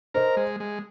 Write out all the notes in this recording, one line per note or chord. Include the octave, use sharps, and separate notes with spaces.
A#4 C5 D#5
G#3
G#3